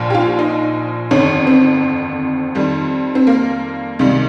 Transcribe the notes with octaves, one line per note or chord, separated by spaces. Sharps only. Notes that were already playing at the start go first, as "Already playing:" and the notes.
Already playing: A#1 A#2 F3
G4
F4
D#4
G1 F2 D#3 C#4
C4
F2 D#3 G3
C4
A#3
C#2 C3 D#3 G3